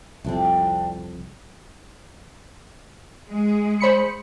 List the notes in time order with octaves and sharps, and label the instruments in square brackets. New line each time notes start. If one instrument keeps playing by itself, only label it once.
[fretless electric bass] C2 F2 [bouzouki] C4 D4 E4
[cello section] G#3 G#4
[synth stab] C5 B5 C#7